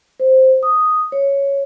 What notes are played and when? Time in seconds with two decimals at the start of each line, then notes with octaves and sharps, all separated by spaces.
0.20 C5
0.63 D#6
1.12 C#5